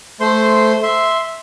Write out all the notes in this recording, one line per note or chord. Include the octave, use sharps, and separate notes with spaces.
A3 C5 C6
E5 C6